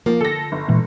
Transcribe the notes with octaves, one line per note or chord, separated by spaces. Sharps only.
F3 A#3
D3 A4 A#6
G1
A#2 E3 G#3